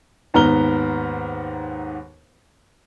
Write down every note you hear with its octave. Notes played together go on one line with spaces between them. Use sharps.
D#2 G#2 B3 A#5 F6 G7